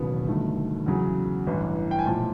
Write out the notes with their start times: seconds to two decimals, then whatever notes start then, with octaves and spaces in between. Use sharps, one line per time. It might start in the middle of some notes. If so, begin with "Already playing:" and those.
Already playing: E1 D#2 C#3 F#3 B3
0.27 G1 G2 D#3 F#3 A3
0.86 E2 C#3 F#3
1.46 A1 G2 E3
1.91 G5
1.99 G#5
2.06 B1 A#2 F3 A3 A5